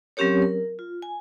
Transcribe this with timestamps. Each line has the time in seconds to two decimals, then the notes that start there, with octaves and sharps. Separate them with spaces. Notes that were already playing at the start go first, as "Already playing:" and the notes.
0.17 F#3 C4 C#4 G4 A#4 C#5
0.42 A#4
0.79 F4
1.02 G#5